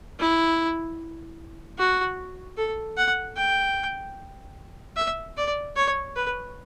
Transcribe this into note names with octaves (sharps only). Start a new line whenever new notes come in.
E4
F#4
A4
F#5
G5
E5
D5
C#5
B4